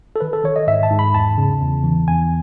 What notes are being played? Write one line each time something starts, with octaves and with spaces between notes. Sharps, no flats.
A4
D#3 B4
A4
D#3 C#5
D#5
G#2 E5
A5
G#2
B5
E2 A5
C#3
E2
E3
E2 G#5